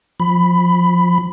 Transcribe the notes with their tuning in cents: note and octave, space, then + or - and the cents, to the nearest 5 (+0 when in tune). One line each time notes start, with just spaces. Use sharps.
F3 +15 B5 +15